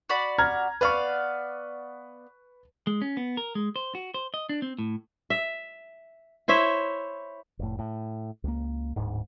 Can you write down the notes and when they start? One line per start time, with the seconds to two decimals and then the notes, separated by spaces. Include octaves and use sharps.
0.10 F#4 D5 B5
0.38 A#5 F6 G#6
0.81 B3 B4 D5 F5 C#6
2.87 G#3
3.02 C#4
3.17 B3
3.37 A#4
3.55 G#3
3.76 C5
3.95 F#4
4.14 C5
4.34 D#5
4.49 D4
4.62 C4
4.78 A2
5.30 E5
6.48 E4 C5 C#5 E5
7.59 F1 A2
7.79 A2
8.44 C#2 A#3
8.96 D1 G#2